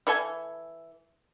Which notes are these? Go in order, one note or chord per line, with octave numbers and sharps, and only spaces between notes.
E3 A4 G#5